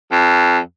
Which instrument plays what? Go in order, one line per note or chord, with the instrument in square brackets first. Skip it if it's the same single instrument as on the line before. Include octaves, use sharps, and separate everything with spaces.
[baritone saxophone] F2